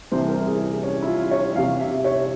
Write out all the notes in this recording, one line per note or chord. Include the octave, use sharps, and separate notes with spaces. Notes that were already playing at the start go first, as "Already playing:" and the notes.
C2 C3 E3 C5
A#4
G#4
C#4
E4
F4
C#5
E2 C3 E3 F5
E5
C#5